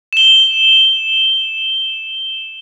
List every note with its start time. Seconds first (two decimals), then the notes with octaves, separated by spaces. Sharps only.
0.13 E7 G7